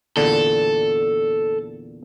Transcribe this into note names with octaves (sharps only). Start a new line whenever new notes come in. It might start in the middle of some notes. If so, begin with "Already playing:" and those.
E2 A#2 D3 A4